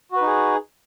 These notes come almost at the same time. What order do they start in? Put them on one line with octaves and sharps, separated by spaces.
F#4 B4 D#4 G#4